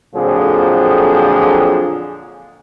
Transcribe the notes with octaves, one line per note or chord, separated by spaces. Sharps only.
F2 A#2 D3 F3 F#3 G#4